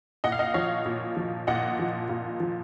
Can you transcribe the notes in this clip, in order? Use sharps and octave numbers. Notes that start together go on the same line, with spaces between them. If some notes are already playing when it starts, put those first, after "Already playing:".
A#2 D#5 F#5
F5
D#5 F#5
F3 C#5 F5
A#2
F3
A#2 D#5 F#5
F3
A#2
F3